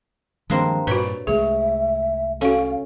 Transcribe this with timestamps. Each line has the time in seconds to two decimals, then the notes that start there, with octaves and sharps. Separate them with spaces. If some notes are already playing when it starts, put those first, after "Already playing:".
0.50 G2 D#3 F3 G#3 A#3 C4
0.87 G2 A#2 F#4 B4 C#5 D5 B5
1.27 C2 G#3 A3 G#4 C#5 E5
2.41 C#4 F#4 A4 F5